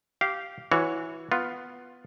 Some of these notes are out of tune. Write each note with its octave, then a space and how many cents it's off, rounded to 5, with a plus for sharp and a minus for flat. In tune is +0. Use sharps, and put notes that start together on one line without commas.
G4 -15 F5 -10
E3 +0 F#4 -20 C#5 +5
B3 +5 F4 +5